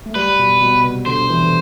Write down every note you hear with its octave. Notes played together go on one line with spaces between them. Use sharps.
A3
G3 B4
B2
B2
C3
D3 C5
E3
D3